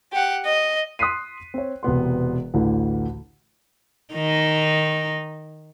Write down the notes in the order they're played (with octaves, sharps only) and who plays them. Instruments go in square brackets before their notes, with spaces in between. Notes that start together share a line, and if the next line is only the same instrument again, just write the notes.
[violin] G4 F#5
D#5
[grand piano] C6 D#6 F#6 B6 C7 D#7
C4 C#5
E1 C3 B3 C6
A1 D2 A2 D3 E3
[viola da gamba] D#3 D#4